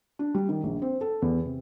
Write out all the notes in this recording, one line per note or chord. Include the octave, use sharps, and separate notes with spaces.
D4
G3
D#3
A#1
C4
A4
E2
C3